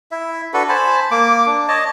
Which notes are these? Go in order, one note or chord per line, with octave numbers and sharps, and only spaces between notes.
E4 E5
D4 F#4 A4 B4
C5 G#5 A5 B5
A#3 D6
D4
C#5 D#5 A5